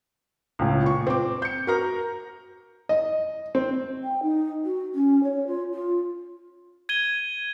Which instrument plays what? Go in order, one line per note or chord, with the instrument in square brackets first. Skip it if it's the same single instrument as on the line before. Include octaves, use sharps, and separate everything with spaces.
[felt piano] C#2 A2
A#2 C#6
C4 D6
G6 C#7
F#4 A#4 A#5
[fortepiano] D#5
C4
[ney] G5
D#4
F#4
C#4
C#5
F4
F4
[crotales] G#6 D#7 G7